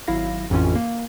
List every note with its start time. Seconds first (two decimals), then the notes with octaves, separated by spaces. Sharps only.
0.08 G#1 F#3 E4 F5 A#6
0.50 A1 F2 A2 E3 C#4 F4
0.76 A#3